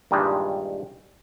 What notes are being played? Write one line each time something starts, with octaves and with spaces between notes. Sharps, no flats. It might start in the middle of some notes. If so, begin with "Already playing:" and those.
G2 A#2 D#3 E3 G3 G#3